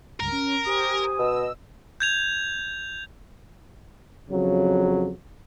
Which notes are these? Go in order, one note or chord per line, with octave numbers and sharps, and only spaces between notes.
C#2 G2 A#4
C#4
G4 C5 G#5 D#6
B2 D#5 E6
G6 G#6 F7
F2 C#3 F#3